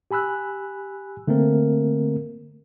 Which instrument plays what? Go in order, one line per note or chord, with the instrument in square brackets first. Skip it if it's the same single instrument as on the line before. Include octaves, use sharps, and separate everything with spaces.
[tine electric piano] G4 G#5 B5 E6 F#6
D3 A3 A#3 C4 A#4